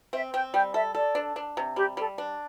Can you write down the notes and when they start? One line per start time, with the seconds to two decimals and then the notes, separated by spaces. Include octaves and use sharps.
0.13 C4 E5
0.33 C4 G5
0.53 G3 G5
0.74 A4 E5
0.95 A4 D5
1.15 D4
1.36 D4
1.57 C3
1.76 G3 G4
1.97 G3 A4
2.18 D4